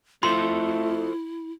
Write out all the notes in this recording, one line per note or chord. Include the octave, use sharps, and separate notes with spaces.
A3 E4 F4 A4 C5 C6